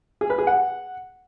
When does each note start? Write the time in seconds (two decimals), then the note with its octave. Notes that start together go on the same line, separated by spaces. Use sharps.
0.21 G#4
0.30 B4
0.38 G#4
0.47 F#5